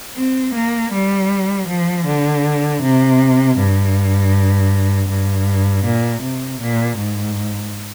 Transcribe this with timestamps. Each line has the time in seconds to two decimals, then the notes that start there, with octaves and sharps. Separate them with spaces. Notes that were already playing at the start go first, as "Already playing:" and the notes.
0.17 C4
0.54 A#3
0.92 G3
1.68 F3
2.06 D3
2.82 C3
3.57 G2
5.09 G2
5.85 A#2
6.22 C3
6.61 A#2
6.98 G#2